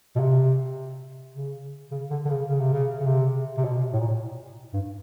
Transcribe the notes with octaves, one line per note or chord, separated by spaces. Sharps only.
B2
C3
C#3
C#3
D3
D3
C#3
C#3
C3
C#3
C#3
C3
C3
B2
A2
A#2
A2
G2